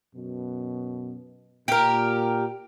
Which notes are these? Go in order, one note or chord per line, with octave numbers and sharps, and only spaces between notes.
F#2 B2
A#2 G4 A#4